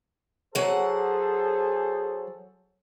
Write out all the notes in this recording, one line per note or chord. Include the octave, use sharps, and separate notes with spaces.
F#3 G#4 A4 C5 F#5